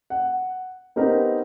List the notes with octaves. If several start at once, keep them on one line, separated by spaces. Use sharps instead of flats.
F#5
B3 C4 D#4 G4 A#4